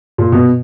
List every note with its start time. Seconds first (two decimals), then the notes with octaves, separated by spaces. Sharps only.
0.18 A#2
0.32 B2